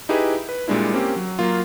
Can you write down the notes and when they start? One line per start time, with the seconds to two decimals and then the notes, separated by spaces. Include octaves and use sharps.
0.09 D#4 E4 G4 G#4 B4
0.49 B4
0.68 A#2 G3 G#3 D4 E4
0.93 A#3 C4 C#4 G4
1.16 F#3
1.39 F#3 A#3 F4